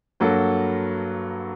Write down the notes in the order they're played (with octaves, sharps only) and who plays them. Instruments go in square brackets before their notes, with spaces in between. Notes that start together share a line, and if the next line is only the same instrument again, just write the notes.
[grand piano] G2 F#3 A#3 F#4 A4